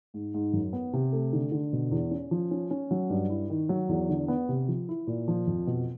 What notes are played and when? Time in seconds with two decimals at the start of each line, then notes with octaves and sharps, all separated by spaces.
0.14 G#2
0.34 G#2
0.53 F#2
0.73 B3
0.93 C3
1.13 A3
1.33 D3
1.52 D3
1.73 B2
1.91 E2
2.11 C#4
2.31 F3
2.51 C#4
2.71 C#4
2.91 F#3
3.10 G2
3.30 E4
3.50 D#3
3.69 F#3
3.89 E2
4.09 D3
4.28 B3
4.49 C3
4.68 F3
4.89 E4
5.07 A#2
5.28 F3
5.47 F2
5.67 B2